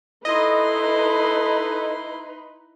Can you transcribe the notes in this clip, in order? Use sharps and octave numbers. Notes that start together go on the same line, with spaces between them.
D#4 E4 A4 B4 D#5 C6